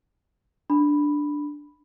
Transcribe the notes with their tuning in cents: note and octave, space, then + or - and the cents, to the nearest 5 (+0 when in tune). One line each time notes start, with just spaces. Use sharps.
D4 +0 B5 +0